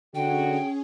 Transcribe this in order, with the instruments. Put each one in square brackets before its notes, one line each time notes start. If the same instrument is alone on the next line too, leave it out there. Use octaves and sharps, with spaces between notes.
[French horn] D3 [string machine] C#4 G#4 [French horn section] F#4 [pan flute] G5